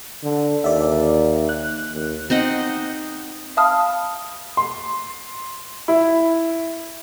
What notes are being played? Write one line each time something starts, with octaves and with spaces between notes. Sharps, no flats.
D3
D#2 D5 E5
F#6
D#2
C4 D#4 D#5 F#5
E5 F5 A5 B5 D#6 F6
C6
E4